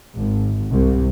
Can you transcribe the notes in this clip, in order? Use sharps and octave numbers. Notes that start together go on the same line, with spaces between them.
G#1
C2